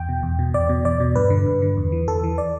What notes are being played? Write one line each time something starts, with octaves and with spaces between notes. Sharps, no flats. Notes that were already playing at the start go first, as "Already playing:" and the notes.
Already playing: E2 G5
B2
E2
B2
E2 D5
B2
E2 D5
B2
G2 B4
D3
G2
D3
E2
E3
E2 A4
E3
D5